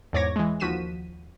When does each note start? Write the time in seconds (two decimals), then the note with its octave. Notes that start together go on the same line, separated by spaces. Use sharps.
0.13 E2 G#2 C#5 D6 G#6 A#6
0.36 E3 G#3
0.60 D#2 F3 F#4 B6 D#7 E7